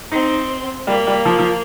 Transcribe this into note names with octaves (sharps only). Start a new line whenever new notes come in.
C4 D#4
G3 A#3
G3
F3
F3